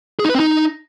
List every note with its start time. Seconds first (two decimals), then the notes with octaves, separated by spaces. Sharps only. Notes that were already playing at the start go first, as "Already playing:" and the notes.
0.19 G#4
0.25 D#4
0.30 B4
0.35 C4
0.40 D#4